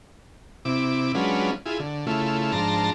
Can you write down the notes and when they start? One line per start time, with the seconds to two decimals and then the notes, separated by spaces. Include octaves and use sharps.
0.65 C3 E4 D6
1.15 F#3 G#3 C#4 D4 F4 B4
1.66 E4 F4 G#4
1.80 D3
2.07 C#3 A3 E4 F4
2.52 G#2 F3 D4 A5 A#5 C6